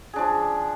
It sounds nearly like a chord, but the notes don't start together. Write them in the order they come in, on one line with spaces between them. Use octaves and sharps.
G#4 D4 F3